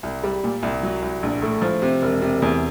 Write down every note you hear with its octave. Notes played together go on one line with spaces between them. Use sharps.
C2
G3
A#2
C2
F#3
C2
A#1
A2
F3
C3
E1
C3
E2